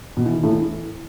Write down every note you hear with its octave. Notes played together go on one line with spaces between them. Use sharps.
B2
E3
D#3
A2
E3